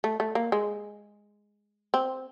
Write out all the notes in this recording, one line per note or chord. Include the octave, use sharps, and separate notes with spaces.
A3
A3
A#3
G#3
C4